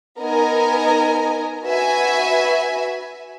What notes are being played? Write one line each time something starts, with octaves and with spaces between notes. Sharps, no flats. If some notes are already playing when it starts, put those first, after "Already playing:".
B3 D#4 A#4 D#5 G#5
F#4 B4 E5 G#5